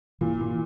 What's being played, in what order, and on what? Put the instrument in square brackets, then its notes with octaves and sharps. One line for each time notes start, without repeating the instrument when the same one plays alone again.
[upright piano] A#2 [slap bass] E3
[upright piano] A#2